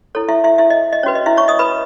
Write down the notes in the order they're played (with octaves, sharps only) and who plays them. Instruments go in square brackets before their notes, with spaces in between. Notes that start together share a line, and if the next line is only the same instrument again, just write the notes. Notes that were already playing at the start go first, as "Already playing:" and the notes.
[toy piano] E4 A4 C#5
E4 E5
E4 E5
E4 E5
D#5
D#5
C#4 F#4 B4 C#5
D#5
E4 E5
C#5 C#6
D#5 D#6
B4 B5